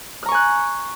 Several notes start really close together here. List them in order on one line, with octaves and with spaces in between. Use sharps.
F6 A#5 C#6 G#5 F#6